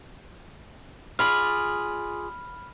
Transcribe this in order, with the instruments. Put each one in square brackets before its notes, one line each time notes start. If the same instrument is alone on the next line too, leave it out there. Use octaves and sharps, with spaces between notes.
[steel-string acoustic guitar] F4 G#4 D5 [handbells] B5 F6